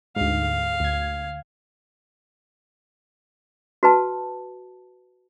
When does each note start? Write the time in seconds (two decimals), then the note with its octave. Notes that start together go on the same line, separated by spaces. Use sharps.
0.16 D2 G#2 F5
0.80 D2 G#6
3.83 F#4 B4 A5